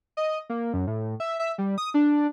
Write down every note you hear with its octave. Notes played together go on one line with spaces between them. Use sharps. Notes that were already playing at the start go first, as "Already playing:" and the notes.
D#5
A#3
F#2
A2
E5
E5
G3
D#6
D4